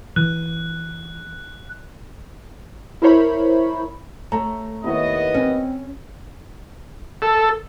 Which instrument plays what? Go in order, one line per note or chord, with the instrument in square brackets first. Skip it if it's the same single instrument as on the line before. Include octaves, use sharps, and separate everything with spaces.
[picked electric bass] E3 [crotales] F#6
[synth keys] E4 A#4 C5 C#5 B5
[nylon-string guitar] A3 [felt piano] C#5 A#5
[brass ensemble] D#2 B3 D#5 [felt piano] E4 C#5
[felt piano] C4 [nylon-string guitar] C#4
[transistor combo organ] A4